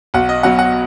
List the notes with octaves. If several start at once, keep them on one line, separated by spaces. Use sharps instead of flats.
B1 F#5
D#5
B2 F#3 F#5
F#5